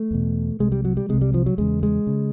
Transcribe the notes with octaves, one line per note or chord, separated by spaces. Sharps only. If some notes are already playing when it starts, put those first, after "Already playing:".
Already playing: A3
E2 B2
C2 C3 G#3
G3
F#3
G3
C2 C3 G#3
G3
F3
F#3
E2 C#3 G#3
G#3
C#3